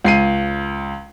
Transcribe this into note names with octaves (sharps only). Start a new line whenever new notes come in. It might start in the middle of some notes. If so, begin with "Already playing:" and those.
C#2 C7 D#7